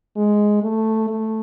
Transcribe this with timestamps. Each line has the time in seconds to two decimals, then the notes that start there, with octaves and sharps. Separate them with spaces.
0.17 G#3
0.63 A3
1.09 A3